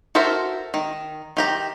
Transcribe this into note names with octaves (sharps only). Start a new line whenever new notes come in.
F#4 A4 A#4 C5 E5
D#3
D#3 G4 A#5